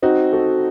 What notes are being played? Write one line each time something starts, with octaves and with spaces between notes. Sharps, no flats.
C4 D#4 F#4
D#4 F#4 A4